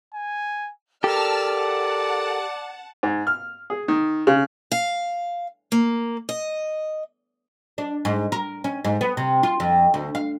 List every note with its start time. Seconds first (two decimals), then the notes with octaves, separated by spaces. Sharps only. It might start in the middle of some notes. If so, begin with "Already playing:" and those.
0.14 G#5
1.04 G4 A4 A#4 D5 A5 E6 F6
1.56 F#5 A5
3.03 G#2
3.27 F6
3.70 G#4
3.88 D#3
4.27 C#3
4.72 F5
5.72 A#3
6.29 D#5
7.78 D4
8.05 G#2
8.32 A#4
8.64 C#4
8.85 G#2
9.01 B3
9.17 C3
9.43 F4
9.60 F2
9.94 D2
10.15 F5